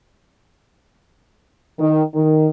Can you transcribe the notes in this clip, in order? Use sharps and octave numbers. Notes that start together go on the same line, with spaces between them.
D#3
D#3